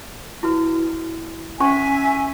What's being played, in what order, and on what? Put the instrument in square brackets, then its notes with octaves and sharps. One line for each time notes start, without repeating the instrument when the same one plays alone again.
[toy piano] E4 F#4 B4
[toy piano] C#4 C5 C#6 [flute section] E5 G#5